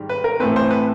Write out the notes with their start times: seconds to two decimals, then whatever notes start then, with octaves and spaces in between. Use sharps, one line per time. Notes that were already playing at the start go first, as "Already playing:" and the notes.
Already playing: G#2 D#3 G3
0.09 B4
0.24 A#4
0.40 A2 E3 A3 C4 B4
0.56 C5
0.71 B4